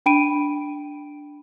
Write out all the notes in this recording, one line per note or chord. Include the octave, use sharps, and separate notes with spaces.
D4 G5 B5 D7 D#7